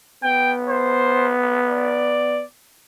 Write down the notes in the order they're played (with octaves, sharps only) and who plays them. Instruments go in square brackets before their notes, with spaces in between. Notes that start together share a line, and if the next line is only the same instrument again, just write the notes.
[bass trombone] B3 [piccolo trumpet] G5
[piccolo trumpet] C5
D5